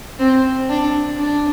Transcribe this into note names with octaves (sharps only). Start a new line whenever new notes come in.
C4
D4
D4